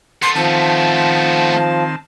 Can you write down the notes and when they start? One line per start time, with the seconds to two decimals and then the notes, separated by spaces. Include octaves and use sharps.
0.22 A3 B3 C6
0.35 D#3 F3 C4 A5